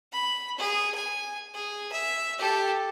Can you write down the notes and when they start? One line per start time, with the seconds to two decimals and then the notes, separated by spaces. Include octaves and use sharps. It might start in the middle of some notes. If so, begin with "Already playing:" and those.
0.13 B5
0.58 G#4
0.95 G#5
1.54 G#4
1.92 E5
2.38 G4 A4